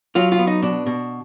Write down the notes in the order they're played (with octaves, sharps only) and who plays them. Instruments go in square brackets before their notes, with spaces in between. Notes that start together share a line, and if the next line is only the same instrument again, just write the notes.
[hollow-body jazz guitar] F#3 F4
F4
B3
D#4
B2 D4
B2